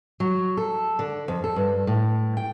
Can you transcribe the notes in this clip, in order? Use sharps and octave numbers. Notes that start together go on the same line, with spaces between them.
F#3
A4
D3
F2
A4
G2
A2
G5